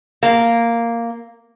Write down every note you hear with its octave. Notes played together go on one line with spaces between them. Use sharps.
A#3